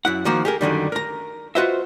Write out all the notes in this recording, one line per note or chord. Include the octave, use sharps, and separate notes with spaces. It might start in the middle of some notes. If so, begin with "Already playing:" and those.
F#2 E4 F#5
D#3 F3 A#3 F#4
G4 G#4 A#4
F#2 D3 D#3 G3
A#4 A#5
F4 F#4 B4 C5 D#5 E5